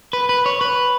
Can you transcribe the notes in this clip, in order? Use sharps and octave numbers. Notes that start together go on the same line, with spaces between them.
B4
B4
C#5
B4